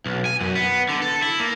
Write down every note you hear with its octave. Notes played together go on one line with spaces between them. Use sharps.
B1
G#5
F#2
B3
D3
A4
E4
A#3